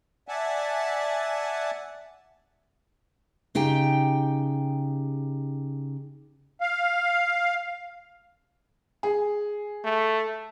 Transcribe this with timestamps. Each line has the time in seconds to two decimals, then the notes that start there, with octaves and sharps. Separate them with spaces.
0.28 D5 E5 F#5 G#5 A5
3.55 C#3 D#4 G4 G5
6.61 F5
9.03 G#4
9.84 A3